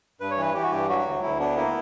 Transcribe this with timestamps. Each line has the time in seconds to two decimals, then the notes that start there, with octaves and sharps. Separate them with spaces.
0.20 G2 B4
0.31 C#5
0.38 E3 B4
0.54 E3 G4
0.63 F#4
0.72 G2 G4
0.89 F#3 F#4
1.06 D2
1.22 D2 E4
1.40 B3 D4
1.56 A#3 E4